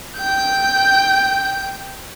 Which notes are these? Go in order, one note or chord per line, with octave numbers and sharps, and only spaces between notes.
G5 G6